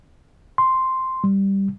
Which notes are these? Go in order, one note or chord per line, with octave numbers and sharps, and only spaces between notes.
C6
G3